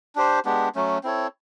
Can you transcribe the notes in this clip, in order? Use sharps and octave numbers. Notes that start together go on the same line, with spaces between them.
D4 G4 C5
G#3 B3 D4 G4
F#3 A3 C#4
C4 E4 A4 C#5